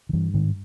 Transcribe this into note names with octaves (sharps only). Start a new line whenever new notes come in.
D#3
G2 E3
G#2 D#3